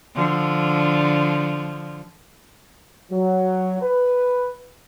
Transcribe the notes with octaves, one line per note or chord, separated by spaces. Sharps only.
D3 F3
F#3
B4